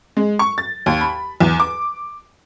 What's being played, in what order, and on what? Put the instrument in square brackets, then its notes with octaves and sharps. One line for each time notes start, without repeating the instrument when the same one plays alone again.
[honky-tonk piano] G#3
C#6
A6
D#2
B5
E2
D6